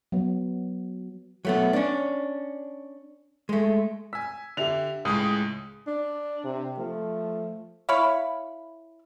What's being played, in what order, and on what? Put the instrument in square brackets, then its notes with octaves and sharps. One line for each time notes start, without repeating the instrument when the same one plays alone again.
[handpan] F#3 B3
[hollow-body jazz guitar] F#3 A3 B3
C#4 D4
G#3 A3
[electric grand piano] G#5 B6 [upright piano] E6
[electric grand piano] D3 [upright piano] G4 E5 F7
[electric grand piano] C#2 A2 G#3 [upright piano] D#6
[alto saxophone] D4
[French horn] C3
[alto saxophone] F3 [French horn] A3
[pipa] E4 C#5 F5 B5